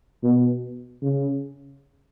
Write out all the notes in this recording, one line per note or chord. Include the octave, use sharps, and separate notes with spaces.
B2
C#3